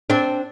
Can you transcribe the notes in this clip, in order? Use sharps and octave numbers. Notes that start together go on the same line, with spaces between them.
C4 D4